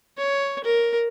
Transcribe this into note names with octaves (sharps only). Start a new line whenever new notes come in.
C#5
A#4